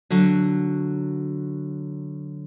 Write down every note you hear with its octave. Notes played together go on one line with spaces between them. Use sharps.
D3 F#3